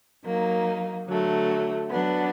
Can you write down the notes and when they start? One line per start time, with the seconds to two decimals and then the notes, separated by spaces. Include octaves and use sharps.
0.24 F#3 A#3 D#4
1.06 D3 F#3 A3
1.89 F#3 B3 D4